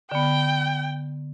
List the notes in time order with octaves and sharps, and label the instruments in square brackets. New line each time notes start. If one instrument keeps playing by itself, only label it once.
[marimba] D3 B3 [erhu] G5